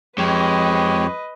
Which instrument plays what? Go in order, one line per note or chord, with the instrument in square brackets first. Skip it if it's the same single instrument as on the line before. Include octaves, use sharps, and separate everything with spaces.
[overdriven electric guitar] F2 [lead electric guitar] G#3 [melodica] G4 C#5 [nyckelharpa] B4 D#5